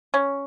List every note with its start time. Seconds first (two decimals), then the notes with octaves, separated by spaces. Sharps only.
0.14 C#4